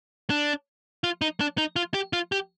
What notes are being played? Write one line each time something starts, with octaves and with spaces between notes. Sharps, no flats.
D4
F4
D#4
D4
D#4
F4
G4
F4
G4